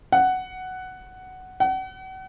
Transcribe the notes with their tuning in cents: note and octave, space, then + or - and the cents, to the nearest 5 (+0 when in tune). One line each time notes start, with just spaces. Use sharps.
F#5 +5
F#5 +35